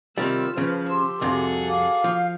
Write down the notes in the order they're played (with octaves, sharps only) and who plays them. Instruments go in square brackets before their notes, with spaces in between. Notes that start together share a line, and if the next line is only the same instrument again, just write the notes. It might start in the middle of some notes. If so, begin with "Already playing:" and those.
[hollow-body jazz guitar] C3 D#3 G3 [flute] F4 [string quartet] E6
[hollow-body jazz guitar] C#3 [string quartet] F3 B4
[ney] G4 [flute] C6 [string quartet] E6
[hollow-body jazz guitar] C2 F2 C3 [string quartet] F#4 G#4 A4
[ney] F5 [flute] D6
[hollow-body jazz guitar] F3